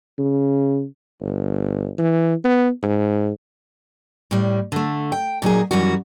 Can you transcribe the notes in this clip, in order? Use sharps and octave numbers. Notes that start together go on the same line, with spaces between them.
C#3
G1
E3
B3
G#2
A2 G3
D3 A3
G5
A#2 F#3 D#4 G#4
F#2 D#3 E3 G3 F#4